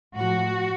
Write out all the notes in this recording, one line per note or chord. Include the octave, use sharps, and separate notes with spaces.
A2 F3 F#4